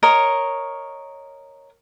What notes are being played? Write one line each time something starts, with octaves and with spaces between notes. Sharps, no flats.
A#4 C#5 D#5